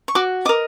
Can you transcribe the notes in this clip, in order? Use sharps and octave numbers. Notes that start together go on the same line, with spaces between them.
C#6
F#4 D6
A#4 D#5 D6